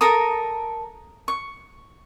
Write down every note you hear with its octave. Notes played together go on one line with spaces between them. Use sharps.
A4 A#4 A#5 D#6
C#6